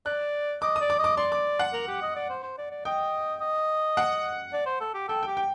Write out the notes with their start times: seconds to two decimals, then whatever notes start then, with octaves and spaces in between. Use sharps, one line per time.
0.06 D5 F#6
0.62 D#5 D6
0.76 D#6
0.81 D5
0.90 D6
0.99 D#5
1.04 D6
1.17 D5 C6
1.32 D6
1.59 F#5
1.73 A#4
1.88 G4
2.02 D#5
2.16 D5
2.30 C5
2.43 C5
2.58 D5
2.71 D5
2.85 D#5 G5
3.41 D#5
3.97 F#5
4.53 D5
4.66 C5
4.81 A4
4.94 G4
5.09 A4 G5
5.23 G5
5.27 G4
5.37 G5